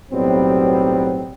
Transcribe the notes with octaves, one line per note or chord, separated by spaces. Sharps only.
B1 A2 F#3 G3 B3 C4